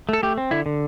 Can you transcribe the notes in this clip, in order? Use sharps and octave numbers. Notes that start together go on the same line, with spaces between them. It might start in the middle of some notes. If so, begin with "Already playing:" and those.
A3 A4
A3 G4
C4
D3 E4
D3